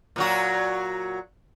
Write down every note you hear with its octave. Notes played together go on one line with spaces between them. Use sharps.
A#2 F#3 F#4